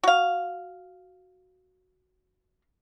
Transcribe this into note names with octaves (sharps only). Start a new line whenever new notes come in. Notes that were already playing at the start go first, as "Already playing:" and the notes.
F#4 F5